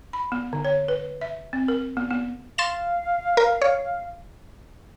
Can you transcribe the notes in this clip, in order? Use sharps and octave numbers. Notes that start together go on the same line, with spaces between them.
B5
B3
D3
C#5
B4
E5
C4
A#4
B3
B3
F5 C6 A6 E7
A#4
C#5